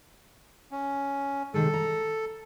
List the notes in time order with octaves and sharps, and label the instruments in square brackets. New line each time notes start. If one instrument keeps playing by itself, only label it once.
[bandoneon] C#4
[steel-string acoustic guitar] C3 D#3 G#3 [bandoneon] A4
[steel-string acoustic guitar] A#5